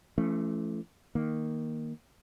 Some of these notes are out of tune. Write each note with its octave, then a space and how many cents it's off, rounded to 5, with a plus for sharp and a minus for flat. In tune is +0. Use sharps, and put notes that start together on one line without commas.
E3 +40 A3 -15 C#4 +0
D#3 +0 A#3 +0